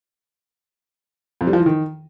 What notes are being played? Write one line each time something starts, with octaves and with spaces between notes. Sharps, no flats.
F2
G3
F3
E3
D#3